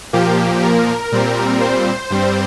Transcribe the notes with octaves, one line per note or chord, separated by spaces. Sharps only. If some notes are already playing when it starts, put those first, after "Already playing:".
A#2 F3 A#3 G4
A#4
A#2 G3 C4
C5
G2 G3 C4